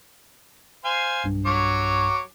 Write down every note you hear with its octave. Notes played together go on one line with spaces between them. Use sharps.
C5 F5 G#5
B1 G2
F#3 C#5 D6